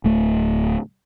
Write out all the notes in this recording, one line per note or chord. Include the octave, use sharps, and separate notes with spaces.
D1 A3